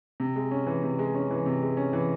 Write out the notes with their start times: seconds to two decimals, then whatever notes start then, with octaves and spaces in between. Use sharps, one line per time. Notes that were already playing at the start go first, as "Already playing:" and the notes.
0.20 C3
0.36 G#3
0.51 C#4
0.67 E3
0.83 C3
0.99 G#3
1.15 C#4
1.31 E3
1.46 C3
1.62 G#3
1.77 C#4
1.93 E3